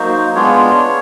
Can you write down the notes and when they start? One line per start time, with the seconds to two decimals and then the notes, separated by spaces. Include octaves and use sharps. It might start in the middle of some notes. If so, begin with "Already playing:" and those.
Already playing: F#3 A#3 D#4 F#4 C5
0.34 G#3 B3 D4 F4 C#5